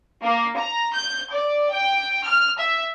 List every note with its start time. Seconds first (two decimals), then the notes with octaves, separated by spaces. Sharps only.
0.22 A#3
0.56 A#5
0.95 G6
1.31 D5
1.71 G5
2.25 F6
2.58 E5